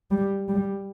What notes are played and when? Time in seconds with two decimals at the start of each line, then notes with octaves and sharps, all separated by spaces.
0.11 G3
0.49 G3